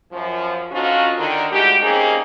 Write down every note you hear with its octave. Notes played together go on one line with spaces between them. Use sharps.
F#2 F3
D3 F3 C#4 D#4 F4 F#4
D3 D#3
D#2 A2 G#3 F#4 G4
G3 A#3 C4 C#4 D#4 G#4